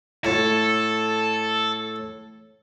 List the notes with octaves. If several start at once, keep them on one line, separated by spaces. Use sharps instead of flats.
A2 A4